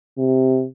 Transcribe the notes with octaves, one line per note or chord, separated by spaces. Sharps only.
C3